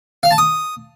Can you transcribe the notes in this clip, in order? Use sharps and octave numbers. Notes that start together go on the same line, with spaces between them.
F5
A5
D#6